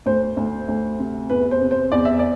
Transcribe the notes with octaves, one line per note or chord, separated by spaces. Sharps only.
D2 C5
D2
D2
C3
E2 B4
C5
C3
C5
E2 D5
E5
D5